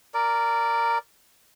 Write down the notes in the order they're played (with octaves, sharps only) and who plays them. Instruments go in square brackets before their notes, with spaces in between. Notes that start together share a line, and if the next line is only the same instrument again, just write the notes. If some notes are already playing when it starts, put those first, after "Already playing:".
[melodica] A#4 D5